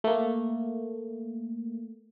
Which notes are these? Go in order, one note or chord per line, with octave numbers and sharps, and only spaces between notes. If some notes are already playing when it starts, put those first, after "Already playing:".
A3 A#3